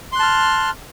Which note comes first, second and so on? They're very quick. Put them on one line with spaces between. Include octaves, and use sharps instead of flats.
C6 F#6 A5 F6